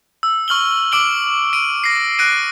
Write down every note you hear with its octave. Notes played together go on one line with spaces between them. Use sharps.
E6
C#6 F6 F#7 G7
D6 E6 D7 F#7 G7
D7 D#7
A#6 C7
F#6 A#6 D7 D#7